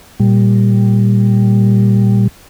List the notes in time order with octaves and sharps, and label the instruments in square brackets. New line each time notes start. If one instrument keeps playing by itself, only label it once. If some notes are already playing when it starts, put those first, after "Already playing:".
[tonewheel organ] A#2 G3